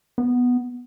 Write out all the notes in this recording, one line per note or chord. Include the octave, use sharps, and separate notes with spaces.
B3